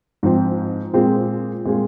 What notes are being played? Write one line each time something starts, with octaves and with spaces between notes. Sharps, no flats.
G#2 F3 C4
A#2 G#3 C4 F4 G#4
A#2 G#3 C4 F4 G#4